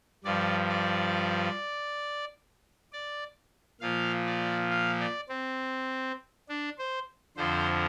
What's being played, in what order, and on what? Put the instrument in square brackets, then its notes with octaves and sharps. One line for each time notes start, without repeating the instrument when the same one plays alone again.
[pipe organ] G2 F3 D5
D5
D5
A#2 F3 F5
D5
F5
D5
C4
D4
C5
F2 D3 F3 C5